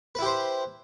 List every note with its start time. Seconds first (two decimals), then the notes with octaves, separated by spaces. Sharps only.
0.15 B4
0.19 E4
0.22 G4
0.26 C5